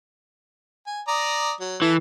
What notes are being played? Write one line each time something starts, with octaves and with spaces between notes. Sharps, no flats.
G#5
D5 A#5 D#6
F#3
E3 A4